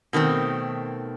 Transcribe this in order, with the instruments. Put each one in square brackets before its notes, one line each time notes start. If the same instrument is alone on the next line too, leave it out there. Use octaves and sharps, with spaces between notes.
[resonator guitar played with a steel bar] B2 D#3 A3 C4